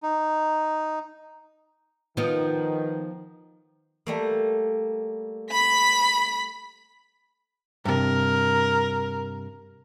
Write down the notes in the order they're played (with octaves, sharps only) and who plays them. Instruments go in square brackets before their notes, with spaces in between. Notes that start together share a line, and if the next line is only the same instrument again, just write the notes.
[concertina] D#4
[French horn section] D#3 [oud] F3 D#4 [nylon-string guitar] B3
[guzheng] G3 A3 A#3
[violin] B5 B6
[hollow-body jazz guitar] G2 C3 [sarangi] A#4